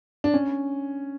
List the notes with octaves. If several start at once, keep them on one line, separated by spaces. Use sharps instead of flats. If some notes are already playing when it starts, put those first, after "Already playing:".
D4
C#4